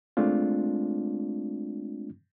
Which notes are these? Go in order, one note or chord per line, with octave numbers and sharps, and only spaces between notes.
G#3 A3 C4 D4 F4